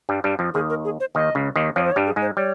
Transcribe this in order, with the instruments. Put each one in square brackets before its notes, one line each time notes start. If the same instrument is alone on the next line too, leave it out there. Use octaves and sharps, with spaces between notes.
[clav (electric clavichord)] G2 G3
G2 G3
F2 F3
[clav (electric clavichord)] D#2 D#3 [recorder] G#4
[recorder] A#4
G#4
C5
[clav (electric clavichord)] D#2 D#3 [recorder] D#5
[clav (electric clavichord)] C#2 C#3
D#2 D#3
[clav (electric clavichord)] F2 F3 [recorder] C#5
[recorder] C5
C#5
[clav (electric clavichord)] G2 G3
[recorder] G#4
[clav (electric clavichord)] G#2 G#3
[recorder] C5
[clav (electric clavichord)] G3 [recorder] C#5